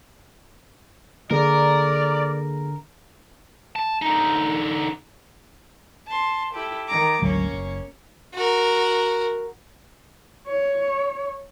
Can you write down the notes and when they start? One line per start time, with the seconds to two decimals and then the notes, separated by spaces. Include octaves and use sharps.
1.31 D3 A#3 G#4 A#4 D5
3.76 A5
4.02 D3 D#4
6.06 A5 C6
6.54 E4 G4 A4
6.87 D#3 A#5 D6
7.22 G#1 D2 F#3 A#3 C#4 C#5
7.52 F#1
8.34 F#4 A#4
10.47 C#5